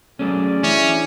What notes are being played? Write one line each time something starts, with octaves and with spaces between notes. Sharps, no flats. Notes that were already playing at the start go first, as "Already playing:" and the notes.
F#3 A3 C#4 G#4 D5
E3 C#4 D4 E5 D6